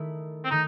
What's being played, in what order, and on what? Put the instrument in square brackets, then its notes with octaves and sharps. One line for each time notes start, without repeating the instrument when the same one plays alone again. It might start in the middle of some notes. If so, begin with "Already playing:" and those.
Already playing: [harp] D#3 A3 E4 A4 E5
[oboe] C4
[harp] D#3 A3 [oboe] D#4